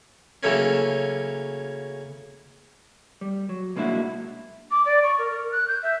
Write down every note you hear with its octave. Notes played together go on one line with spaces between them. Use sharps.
C#3 E3 F#3 A3 A#3 C#4
G3
F#3
C2 G#3 A#3 D4 E4 F#4
D6
D5
C#6
A#4
A#4
F#6
G6
E5